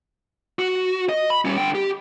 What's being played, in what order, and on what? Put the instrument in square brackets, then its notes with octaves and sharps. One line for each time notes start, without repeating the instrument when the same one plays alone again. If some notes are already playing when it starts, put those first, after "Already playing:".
[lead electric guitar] F#4
D#5
B5
G3 C#4
D3 G5
G4